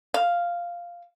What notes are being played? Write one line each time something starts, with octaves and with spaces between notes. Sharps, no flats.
F5